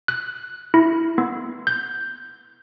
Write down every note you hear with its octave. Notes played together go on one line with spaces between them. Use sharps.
F#6
E4
B3
G6